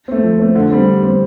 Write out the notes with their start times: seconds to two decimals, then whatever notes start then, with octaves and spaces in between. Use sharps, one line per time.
0.08 A3 C4
0.24 F3
0.39 A3 C4
0.55 D3
0.71 G3 C4
0.87 D3
1.03 G3 C4